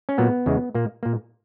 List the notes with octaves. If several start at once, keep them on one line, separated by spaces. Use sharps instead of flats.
C#4
A#2 F#3 A#3 B3
E2 C#3 G#3
A#2 A#3
A#2 A#3